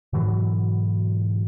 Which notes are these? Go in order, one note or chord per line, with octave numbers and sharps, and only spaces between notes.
G#2 B2 E3 F#3